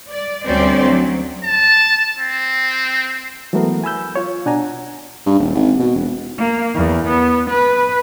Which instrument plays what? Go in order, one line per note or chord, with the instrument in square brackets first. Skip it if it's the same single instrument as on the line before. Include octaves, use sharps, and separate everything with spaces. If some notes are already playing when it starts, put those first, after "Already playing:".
[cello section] D5
D2 G3 C4 C#4 C5 D5
F#3
[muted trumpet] A5
C4
[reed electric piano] E3 F#3 G#3 A3 B3 A#4
G#5 B5 E6 G6
F4 C#5
B2 D4 F#5 G#5 A#5
[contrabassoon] G2
D#1
G#1
B2
E1
[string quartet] A#3
E2
B3
B4